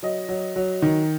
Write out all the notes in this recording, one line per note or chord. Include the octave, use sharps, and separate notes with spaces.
F#3 D#5
F#3
F#3
D#3